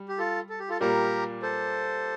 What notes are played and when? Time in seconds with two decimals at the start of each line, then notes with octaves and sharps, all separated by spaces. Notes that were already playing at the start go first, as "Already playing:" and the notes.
Already playing: G3
0.08 G4
0.18 F4 A4
0.50 A4
0.59 G4
0.69 F4 A4
0.80 A#2 G3 A#3 G4 A#4
1.42 A4 C5